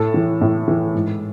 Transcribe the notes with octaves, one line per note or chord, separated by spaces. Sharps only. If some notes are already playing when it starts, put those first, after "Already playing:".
Already playing: A2 A4
E3
A2
E3
G#2